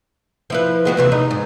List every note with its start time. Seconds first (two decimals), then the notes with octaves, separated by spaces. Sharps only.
0.50 F3 E4 B4
0.85 G#3 B3 F#4
0.97 D#2 C3 E3
1.12 D#4
1.31 G#2